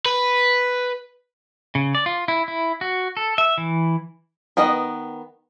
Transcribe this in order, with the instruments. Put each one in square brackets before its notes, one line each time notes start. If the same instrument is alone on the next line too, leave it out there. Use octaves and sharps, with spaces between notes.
[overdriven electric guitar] B4
[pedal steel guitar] C#3
D5
F4
E4
E4
F#4
A4
E5
E3
[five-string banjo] D#3 B3 B4 D#5